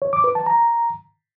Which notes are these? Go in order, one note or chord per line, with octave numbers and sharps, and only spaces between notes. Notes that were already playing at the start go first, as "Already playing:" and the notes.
C#5
D6
B4
A5
A#5